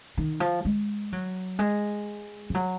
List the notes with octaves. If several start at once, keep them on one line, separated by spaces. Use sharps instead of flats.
D#3
F3
G#3
F#3
G#3
F3
F#3